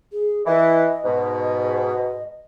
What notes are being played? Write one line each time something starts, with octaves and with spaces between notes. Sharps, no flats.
G#4
E3 D#5
G#2 B2
D#5